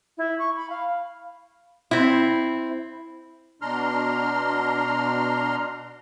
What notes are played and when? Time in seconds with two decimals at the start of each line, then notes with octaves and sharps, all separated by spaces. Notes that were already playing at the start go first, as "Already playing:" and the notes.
0.18 E4
0.39 C#6
0.56 B5
0.70 F5
1.91 C4 E4
3.62 B2 D4 A#5 C6 F6